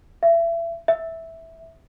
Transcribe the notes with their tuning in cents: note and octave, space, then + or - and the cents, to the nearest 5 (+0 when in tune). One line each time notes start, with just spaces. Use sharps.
E5 +30
E5 -5